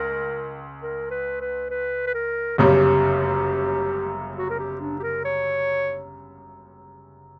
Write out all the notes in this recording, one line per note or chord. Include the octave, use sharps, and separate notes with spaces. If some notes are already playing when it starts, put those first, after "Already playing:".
Already playing: C#2 A#4
A#4
B4
B4
B4
B4
A#4
G1 F#2 C#3 G3 C#4 G4
F#4
A#4
G4
D4
G4
A#4
C#5